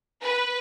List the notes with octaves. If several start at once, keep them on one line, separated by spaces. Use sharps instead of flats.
B4